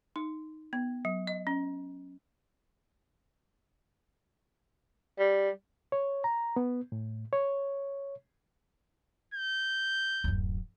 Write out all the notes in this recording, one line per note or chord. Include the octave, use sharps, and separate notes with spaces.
D#4
B3
F#3
D#5
C#4
G3
C#5
A#5
B3
A2
C#5
G6
D1 F#2